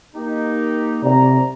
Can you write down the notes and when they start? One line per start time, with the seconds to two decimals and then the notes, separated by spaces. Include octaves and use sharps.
0.16 A#3 D#4 G4
1.03 C3 D5 A#5